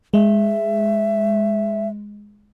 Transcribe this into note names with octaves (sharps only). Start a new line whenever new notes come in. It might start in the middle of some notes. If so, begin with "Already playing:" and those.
G#3 E5